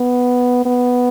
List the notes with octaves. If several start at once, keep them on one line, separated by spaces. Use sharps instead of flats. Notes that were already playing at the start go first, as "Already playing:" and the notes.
Already playing: B3
B3